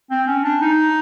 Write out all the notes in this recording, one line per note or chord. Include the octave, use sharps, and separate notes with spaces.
C4
C#4
D4
D#4